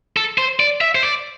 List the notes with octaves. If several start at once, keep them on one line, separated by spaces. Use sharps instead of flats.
A4
C5
D5
E5
C5
D5